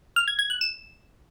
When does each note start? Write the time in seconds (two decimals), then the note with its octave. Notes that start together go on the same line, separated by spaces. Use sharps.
0.16 F6
0.28 G#6
0.39 G#6
0.50 F#6
0.61 E7